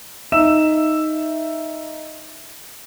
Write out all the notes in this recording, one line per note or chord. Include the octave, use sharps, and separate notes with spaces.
D#4 E5 E6 E7